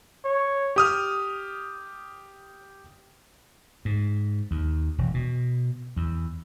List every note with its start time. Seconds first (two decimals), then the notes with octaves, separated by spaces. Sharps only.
0.25 C#5
0.76 G4 D#6 F6
3.85 G#2
4.51 D#2
4.98 E1
5.14 B2
5.97 E2